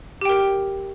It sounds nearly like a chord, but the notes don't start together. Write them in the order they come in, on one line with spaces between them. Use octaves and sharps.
G4 G5 A#4